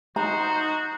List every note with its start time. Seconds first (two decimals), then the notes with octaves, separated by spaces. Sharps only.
0.16 D#4 F#4 C5 A#5